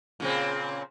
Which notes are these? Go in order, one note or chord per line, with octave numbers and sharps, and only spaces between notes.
A#2 C#3 C4